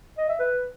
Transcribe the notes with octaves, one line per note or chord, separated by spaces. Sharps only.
D#5
E5
B4